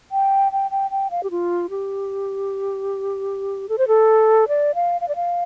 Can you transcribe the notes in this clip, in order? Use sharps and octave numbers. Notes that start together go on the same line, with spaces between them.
G5
G5
G5
G5
F5
G4
F4
G4
A4
C5
A4
D5
F5
F5
D5
F5